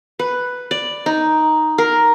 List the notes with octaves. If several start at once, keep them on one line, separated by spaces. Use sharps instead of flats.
B4
D5
D#4
A#4